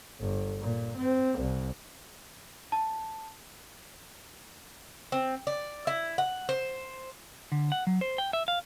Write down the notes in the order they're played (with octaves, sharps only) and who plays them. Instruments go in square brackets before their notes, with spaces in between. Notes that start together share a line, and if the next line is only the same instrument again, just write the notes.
[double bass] G1
A#2
C4
C2
[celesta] A5
[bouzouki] C4
D5
E4
F#5
C5
[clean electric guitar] D3
F#5
F#3
C5
G5
E5
F5